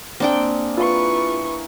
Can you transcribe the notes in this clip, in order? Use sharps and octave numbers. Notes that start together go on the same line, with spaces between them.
A#3 C4 D4 G#4 G5
E4 F4 B4 C#6